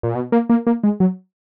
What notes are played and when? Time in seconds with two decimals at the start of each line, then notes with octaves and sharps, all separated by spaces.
0.03 A#2
0.15 B2
0.32 A#3
0.50 A#3
0.67 A#3
0.84 G#3
1.00 F#3